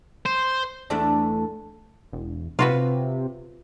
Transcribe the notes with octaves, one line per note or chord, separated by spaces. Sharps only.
C5
E2 A3 D4
E1
C3 F4 F#4 B4